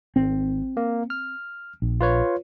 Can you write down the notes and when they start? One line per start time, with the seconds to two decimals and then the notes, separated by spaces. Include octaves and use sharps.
0.16 G#1 C4
0.77 A#3
1.10 F6
1.82 A#1
2.01 F4 B4 C#5